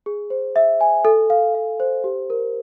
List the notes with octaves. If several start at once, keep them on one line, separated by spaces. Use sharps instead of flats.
G#4
C5
E5
G#5
A4
F5
F5
C5
G4
A#4